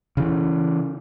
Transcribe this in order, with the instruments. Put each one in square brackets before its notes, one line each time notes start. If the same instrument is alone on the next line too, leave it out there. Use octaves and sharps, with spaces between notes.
[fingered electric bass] C#3 E3